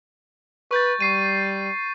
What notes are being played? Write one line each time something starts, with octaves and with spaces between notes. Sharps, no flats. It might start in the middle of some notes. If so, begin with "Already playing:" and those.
B4 C#6 G6 A6
G3 C#6 C7 D#7